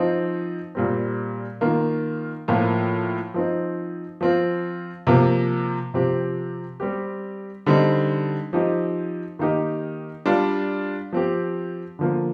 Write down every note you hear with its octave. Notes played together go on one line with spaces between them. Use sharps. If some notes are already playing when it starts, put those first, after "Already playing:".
Already playing: F3 C4 D#4
A#2 G3 C4
D#3 A#3 F4
A2 F3 A#3 F4
F3 C4 D#4
F3 C4 F4
C3 F3 A#3
C3 F3 C4 G4
G3 C4 G4
D3 G3 C4 D#4
F3 C4 D#4 G4
D#3 A#3 D#4 G4
G3 D4 F4
F3 C4 G4
D3 F3 A#3